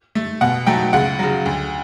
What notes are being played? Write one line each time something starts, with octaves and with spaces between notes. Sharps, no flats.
A3
B2 F#5
F#3 A3 G5
C#2 F#5
C#3 F#3
D2